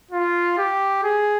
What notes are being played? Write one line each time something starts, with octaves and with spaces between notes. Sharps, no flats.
F4
G4
G#4